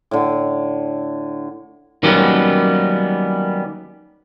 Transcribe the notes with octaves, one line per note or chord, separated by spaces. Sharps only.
A2 D3
D#3 F#3 G3 A#3 B3 C#4